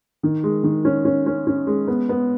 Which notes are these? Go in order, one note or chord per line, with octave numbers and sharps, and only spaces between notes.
D#3
G#3
D#3
C#4
C#4
C#4
C#4
G#3
B3
B3